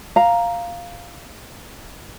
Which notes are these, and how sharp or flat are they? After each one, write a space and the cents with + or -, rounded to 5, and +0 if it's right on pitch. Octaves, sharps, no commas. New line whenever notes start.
F5 +0 A#5 +0